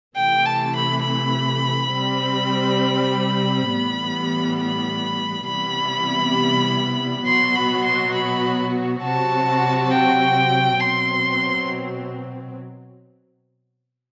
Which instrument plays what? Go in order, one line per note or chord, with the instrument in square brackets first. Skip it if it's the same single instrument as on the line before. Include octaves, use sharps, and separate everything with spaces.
[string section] C3 E3 A3 [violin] G5
[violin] A5
B5
B5
[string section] C3 G3 C4
A2 E3 G3 B3
[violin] B5
[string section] C3 E3 G3 B3 E4 [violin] B5
[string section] B2 F#3 B3 F#4 [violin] C6
[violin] B5
C6
B5
[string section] C3 F#3 C4 F#4 [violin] A5
[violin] G5
[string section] B2 F#3 C4 [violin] C6